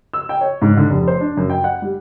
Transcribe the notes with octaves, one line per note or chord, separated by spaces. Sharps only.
E6
G5
C#5
G#2
D3
F1
C5
D4
F#2
G5
F#5
G3